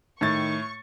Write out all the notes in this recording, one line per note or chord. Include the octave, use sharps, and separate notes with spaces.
A2 D#3 C#6 A6